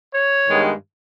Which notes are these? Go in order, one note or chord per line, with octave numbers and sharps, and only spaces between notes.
C#5
G2 D#3 G#3 B3